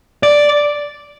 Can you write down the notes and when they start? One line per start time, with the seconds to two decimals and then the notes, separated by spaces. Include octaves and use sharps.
0.23 D5